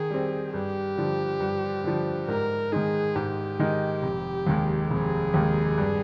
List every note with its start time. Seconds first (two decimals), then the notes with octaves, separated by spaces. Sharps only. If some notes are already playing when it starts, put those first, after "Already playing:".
Already playing: D#3 G#4
0.10 G3 C4
0.53 G2 G4
0.98 D3 F3
1.40 G2
1.84 D3 F3
2.28 G#2 A#4
2.72 D#3 G#3 D#4 G#4
3.16 G#2 G4
3.59 D#3 G#3 D#4
4.03 F1
4.47 D#2 D#3 G#3
4.90 F1 G#4
5.34 D#2 D#3 G#3
5.78 G2